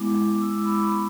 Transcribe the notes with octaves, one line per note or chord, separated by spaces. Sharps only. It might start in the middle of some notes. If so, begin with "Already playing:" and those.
Already playing: G#3 B3 E4 D6
D6
E6
D6
B5
B5
C#6